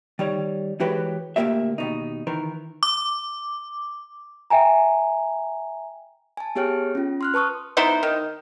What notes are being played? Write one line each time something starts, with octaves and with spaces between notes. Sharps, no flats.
D#3 G3 C#5
E3 G#3 F#4 G4 B4 C#5
D2 A#2 F#3 A#3 G4 E5
D#2 B2 D#4
D#3 E3 A#4
D6
E5 G5 G#5 A#5
G#5 A5
B3 G4 G#4 C#5 G5 F6
C#4 F4
C6 F6 F#6
B4 A5 C#6 D#6 F6
B3 D#4 E4 C5
D#3